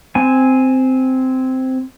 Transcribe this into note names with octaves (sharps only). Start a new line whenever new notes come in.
C4 G#5